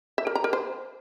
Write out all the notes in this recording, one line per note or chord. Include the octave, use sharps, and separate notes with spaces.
E5
A#4
A#5
A#4
C5